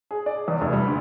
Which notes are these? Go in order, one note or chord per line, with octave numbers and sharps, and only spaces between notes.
G#4
D5
E2
F1
G3
D2